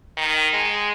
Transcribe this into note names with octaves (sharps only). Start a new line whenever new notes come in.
D#3
G#3